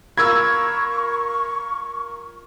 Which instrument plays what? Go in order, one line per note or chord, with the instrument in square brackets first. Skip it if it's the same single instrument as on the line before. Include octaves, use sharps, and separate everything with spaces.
[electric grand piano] F4 A#4 B5 [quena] C#6 [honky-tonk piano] E6 G#6